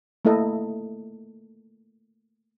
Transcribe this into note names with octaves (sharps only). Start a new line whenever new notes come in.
A3 A#3 E4 A4 D#5